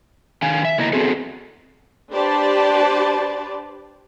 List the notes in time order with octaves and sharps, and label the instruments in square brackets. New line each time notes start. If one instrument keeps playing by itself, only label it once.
[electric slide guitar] D#3 F5 G#5
E5
C#3 A#3 E4 D#5 A#5
B3 C4 F#4 G#4 A4
[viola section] D4 G4 B4 C5 D5 A5